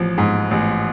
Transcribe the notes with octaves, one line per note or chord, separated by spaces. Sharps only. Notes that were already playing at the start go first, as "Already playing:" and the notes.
Already playing: A1 F3
G#2
A1